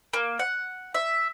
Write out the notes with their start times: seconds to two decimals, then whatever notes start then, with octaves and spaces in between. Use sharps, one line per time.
0.13 A#3
0.39 F#5
0.94 E5